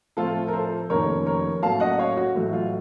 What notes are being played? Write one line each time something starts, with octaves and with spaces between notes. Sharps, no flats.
A2 F3 A3 C4 F4 A4
A#4
A4 C5
F1 F2 D#3 A#3 C#4 A#4 C#5
A#4 C#5
A2 F#3 A#3 C#4 F5 A5
D#5 F#5
C#5 F5
F#4
A1 A2 F#3
F4